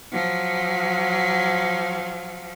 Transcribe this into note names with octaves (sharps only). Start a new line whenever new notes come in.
F3 F#3